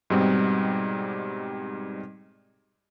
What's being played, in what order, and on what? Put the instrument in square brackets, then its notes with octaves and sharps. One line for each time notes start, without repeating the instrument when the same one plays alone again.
[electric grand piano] G#2 B2 G3 C4 D#4